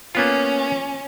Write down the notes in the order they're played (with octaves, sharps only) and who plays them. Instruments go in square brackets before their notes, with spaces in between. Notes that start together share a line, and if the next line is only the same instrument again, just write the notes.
[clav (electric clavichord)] A#3 B3 F4 [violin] C#4